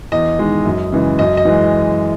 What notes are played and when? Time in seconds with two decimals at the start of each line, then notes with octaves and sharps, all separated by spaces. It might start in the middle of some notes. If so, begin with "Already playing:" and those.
0.12 E2 D#5
0.39 D#3 G#3
0.65 F#2
0.92 C#3 E3 G#3
1.19 F#2 D#5
1.37 D#5
1.45 E3 G#3